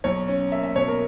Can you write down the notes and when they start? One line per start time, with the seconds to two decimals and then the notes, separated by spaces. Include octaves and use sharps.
0.04 B1 C#5
0.28 C#4
0.52 A#3 E5
0.63 E5
0.76 B2 C#5
0.88 A#4